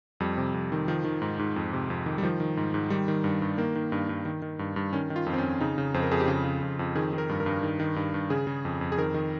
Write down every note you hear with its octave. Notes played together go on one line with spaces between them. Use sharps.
F2 G3
C3
F2
D#3
D#3 F3
D#3
G#2
G#2
F2
C3
F2
D#3
G3
D#3 F3
D#3
G#2
G#2
D#3 G3
D#3
G2
G2
D#3 A#3
D#3
G2
G2
D#3
D#3
G2
G2
D#3 C#4
D#3
F4
F2
C4
C#4
F2
C#3 D#4
C#3
F2 C5
A#4
F2 G#4
G4
C#3 F4
C#3
F2
F2
D#3 G#4
D#3
A#4
G2
A#4
G2
D#3
D#3
G2
G2
C#3 G#4
C#3
F2
F2
G#4
D#3 A#4
D#3